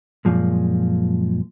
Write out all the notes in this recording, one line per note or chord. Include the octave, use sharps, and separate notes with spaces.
F#2 A#2 F3 G#3